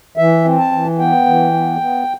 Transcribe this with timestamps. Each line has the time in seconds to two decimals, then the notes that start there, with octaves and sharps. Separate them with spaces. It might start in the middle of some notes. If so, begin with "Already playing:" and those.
0.17 E3 E5
0.45 C4
0.58 A5
0.72 E3
0.99 B3 G5
1.26 E3
1.53 B3
1.81 B3